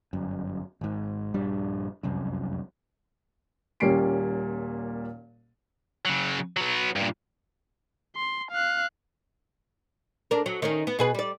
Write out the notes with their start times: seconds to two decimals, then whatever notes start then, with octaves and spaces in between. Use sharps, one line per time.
0.13 G1 F#2
0.81 G#1 G#2
1.34 A#1 G2 G3 D4
2.03 F1 C2 F#2
3.80 D#1 A#2 G3 C#4 C7 D7
6.05 C#3 F#3
6.57 F#3 B3
6.96 G2 A#2
8.16 C6
8.52 F5 F#6
10.31 D4 A#4
10.46 F#3
10.62 D#3 C#4 A#4
10.87 B3
10.99 B2 G#4 B4
11.15 G3 D5